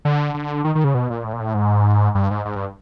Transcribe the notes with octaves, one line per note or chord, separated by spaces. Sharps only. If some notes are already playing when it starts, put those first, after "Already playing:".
D3
D3
D#3
D#3
C#3
B2
A#2
A2
A#2
A2
G#2
G2
G#2
G#2
G2